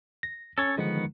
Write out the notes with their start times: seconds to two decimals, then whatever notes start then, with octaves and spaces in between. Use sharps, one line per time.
0.23 A#6
0.58 C#4 A4 C#5 A6
0.77 D3 D#3 F3 G#3 B3 F#5